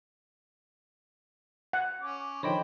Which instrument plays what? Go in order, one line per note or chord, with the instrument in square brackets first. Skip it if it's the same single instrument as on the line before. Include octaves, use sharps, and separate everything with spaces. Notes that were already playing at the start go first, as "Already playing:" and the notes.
[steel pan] F#5
[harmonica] C#4 D6
[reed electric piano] D3 D#3 F3 [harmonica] C5 B5 [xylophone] C#5 D#5 G5